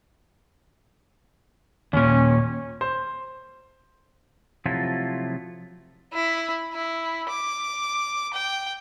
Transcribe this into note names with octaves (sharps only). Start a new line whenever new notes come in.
D#2 A#2 C#4
C5
C3 F3 F#3 A3 E4 F4
E4
E4
D6
G5